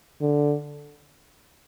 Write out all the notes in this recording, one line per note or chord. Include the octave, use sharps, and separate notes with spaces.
D3